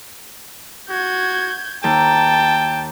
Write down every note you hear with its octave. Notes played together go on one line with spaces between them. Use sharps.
F#4 G6 G#6
D#2 G5 A5